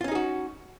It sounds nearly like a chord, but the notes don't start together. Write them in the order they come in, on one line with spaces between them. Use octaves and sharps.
F4 C#4 D#4 G#4 F#4